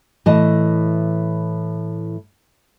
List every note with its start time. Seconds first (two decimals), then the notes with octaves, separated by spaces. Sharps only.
0.26 A2 E3 D#5 A5